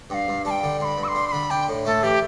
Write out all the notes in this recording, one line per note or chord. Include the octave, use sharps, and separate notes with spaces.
G2 F5 G5
G2
G3 A5
G5
D3
G2 B5 C6
G2
E6
C6
G3
C6
D3 B5
D4 G5
A2
A3 A4
E3 G4